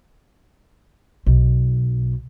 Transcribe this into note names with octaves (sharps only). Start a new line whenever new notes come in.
B1